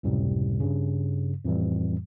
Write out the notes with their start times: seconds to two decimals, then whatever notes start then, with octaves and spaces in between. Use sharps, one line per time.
0.03 C#2 F#2 A2 C3 G3
0.60 G2 C#3
1.45 F2 A2 E3 G3